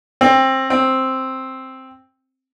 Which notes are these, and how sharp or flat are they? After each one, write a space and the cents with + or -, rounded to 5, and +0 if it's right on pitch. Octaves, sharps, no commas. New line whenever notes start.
C4 +20
C4 +5